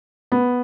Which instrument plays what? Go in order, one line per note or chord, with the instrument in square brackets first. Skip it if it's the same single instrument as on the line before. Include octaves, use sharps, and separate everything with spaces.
[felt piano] B3